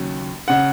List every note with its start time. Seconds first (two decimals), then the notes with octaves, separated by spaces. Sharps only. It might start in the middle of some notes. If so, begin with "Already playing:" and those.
Already playing: D#2 C#3 F#3
0.48 C#3 F#5